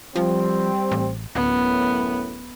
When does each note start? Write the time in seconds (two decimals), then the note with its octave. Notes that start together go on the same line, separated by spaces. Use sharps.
0.16 F3 G3 C4
0.91 A1
1.35 D1 F#2 A2 B3